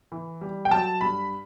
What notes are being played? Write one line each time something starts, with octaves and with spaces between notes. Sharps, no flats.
E3
G3
G5
F#3 A5
G2 B5